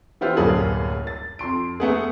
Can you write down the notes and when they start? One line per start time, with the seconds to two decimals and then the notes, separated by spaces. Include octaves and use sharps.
0.21 E3 B3 E4 F4 G4 C5
0.36 D1 F#2 G3 A#3 G#4 A4
1.07 A6
1.39 F2 C6 D7
1.80 A3 B3 G#4